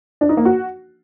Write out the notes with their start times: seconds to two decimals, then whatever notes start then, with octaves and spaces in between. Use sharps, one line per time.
0.21 D4
0.29 D#4
0.37 A#3
0.45 F#4